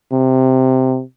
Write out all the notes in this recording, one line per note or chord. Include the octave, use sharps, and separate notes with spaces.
C3